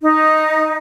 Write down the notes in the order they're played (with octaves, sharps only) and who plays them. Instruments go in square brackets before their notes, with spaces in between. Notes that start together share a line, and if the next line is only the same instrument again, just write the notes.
[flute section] D#4